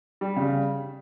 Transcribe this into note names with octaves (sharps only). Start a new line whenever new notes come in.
G3
C#3